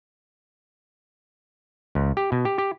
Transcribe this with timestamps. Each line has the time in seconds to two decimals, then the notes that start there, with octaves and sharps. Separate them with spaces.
1.95 C#2
2.17 G4
2.32 B2
2.45 G4
2.58 G4